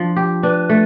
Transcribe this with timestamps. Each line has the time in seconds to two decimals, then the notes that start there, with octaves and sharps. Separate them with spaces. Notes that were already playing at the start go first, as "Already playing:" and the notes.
Already playing: F3 D4
0.16 G4
0.43 D4 B4
0.69 A3